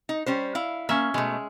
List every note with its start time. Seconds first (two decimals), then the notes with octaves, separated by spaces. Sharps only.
0.09 D#4
0.26 G3 C#4 C5
0.55 E4 F5
0.89 A#3 C#4 E5
1.14 B2 G#3 A3